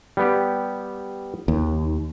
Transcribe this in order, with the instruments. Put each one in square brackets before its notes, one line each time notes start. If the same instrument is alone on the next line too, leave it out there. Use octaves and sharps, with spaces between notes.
[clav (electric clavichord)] G3 B3 G4
[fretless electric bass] D#2